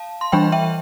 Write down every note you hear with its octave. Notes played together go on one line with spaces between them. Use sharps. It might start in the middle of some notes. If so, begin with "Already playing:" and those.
Already playing: F5 A5
C6
E3 G3 D4 G5 B5
E5 G5